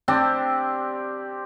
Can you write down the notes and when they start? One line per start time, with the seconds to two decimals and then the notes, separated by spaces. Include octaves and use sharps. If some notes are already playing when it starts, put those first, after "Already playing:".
0.08 C4 D4 G4